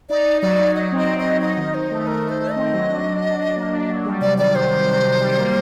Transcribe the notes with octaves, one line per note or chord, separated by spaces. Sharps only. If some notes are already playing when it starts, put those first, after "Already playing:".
D#4 D5
D#4
F#3 D5
D#4
F#3 D#5
C4
D#5
C4
D#5
F#3
D#4 D#5
D#3
D#4 C5
A3
A3 A#4
A3
C5
A3
C4 D#5
F#3
D4
D4
D4
D4
A#3
D4
F#3
G3
C3 D5
D#3 D5
C3 C5
D#3
C3
C3
G3
A#3